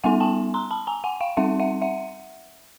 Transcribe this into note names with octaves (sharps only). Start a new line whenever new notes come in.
G3 B3 D#4 F#5 G#5
G5 A5
A#5 C6
A5 B5
G#5 A#5
F#5 G#5
F5 G5
G3 C4 D#4 E5 F#5
E5 F#5
E5 F#5